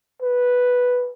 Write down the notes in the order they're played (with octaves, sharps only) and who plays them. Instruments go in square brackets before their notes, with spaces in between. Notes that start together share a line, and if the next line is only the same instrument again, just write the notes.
[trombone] B4